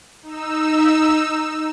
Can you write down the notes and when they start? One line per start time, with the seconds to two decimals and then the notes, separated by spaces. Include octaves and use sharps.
0.23 D#4 E6